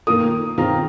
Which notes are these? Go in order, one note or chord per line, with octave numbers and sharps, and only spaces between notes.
D#3 A#3 F4 A#4 D#6
D#3 C4 F4 G#4 A#5